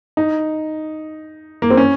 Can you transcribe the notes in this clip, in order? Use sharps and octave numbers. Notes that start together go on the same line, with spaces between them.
D#4
A#3
C4
C#4